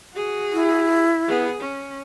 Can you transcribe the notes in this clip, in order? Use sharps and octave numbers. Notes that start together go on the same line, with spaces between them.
F#4 G#4
E4
B3 G#4
C#4